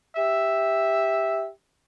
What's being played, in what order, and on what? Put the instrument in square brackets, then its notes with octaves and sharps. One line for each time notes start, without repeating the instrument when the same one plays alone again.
[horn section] G4 E5